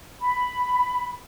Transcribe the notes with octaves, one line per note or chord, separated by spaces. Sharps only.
B5